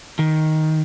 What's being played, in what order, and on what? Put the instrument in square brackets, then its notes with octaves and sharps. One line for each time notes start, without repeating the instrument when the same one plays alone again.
[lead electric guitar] D#3